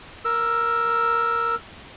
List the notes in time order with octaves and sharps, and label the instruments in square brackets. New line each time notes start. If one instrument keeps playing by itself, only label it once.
[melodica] A#4 E6